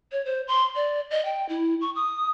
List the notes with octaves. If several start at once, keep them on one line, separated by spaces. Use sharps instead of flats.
C#5
C5
C6
D5
D#5
G5
E4
C#6
D#6